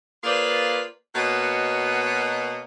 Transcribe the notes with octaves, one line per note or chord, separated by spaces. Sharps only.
A#3 F4 G#4 B4 C5 D5
B2 A#3 F#4 C#5 D#5 F#5